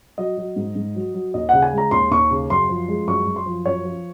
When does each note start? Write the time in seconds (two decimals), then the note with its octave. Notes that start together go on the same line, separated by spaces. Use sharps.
0.18 F#3 D#5
0.37 F#3
0.56 G#2
0.75 G#2
0.95 F#3
1.14 F#3
1.34 D#2 D#5
1.49 C#3 F#5
1.62 G#5
1.73 G#3 A#5
1.91 D#2 C6
2.11 D#2 C#6
2.31 C#3
2.50 F#2 C6
2.69 F3
2.88 G#3
3.07 F#2 C#6
3.26 F#2
3.36 C6
3.46 F3
3.66 F#2 C#5
3.85 F3